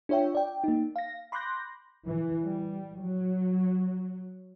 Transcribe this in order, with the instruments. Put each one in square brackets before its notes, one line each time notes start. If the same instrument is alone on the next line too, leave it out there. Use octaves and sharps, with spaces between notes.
[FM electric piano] D4 F4 C#5 E5 G5
D5 G5
A#3 D#4
F5 A#6
B5 C6 D6 F#6 G6 A#6
[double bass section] E3
G3
F#3